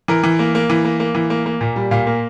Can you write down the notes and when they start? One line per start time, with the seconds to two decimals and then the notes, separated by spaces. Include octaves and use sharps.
0.08 E3 A#4
0.24 E3
0.39 A#3
0.55 A#3
0.70 E3
0.85 A#3
1.00 A#3
1.15 E3
1.30 A#3
1.46 A#3
1.61 A#2
1.76 G3
1.91 A#2 F5
2.07 A#3